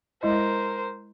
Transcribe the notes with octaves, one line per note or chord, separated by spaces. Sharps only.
G#3 E4 A#4 C5 D#5